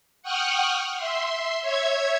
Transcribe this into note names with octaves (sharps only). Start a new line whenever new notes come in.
F#5 G5 C#6 D#6 F6 F#6
E5 C6
C#5 E5 G#6